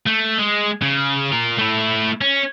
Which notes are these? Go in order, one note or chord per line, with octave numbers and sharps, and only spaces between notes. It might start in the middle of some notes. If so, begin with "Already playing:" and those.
A3
G#3
C#3
F4 A#4
A3 E4
C#4